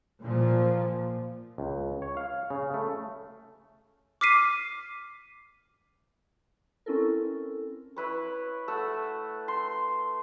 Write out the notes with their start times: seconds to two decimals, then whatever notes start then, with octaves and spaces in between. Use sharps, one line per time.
0.22 A#2 F3
1.58 C#2
2.02 C#5
2.17 F5
2.50 C#3
2.74 A3
4.21 D6 F6 B6 C7 D#7
6.86 C4 C#4 E4 A4 A#4
7.96 E4 B4 C#5
8.68 A3 E5 F#5
9.48 C6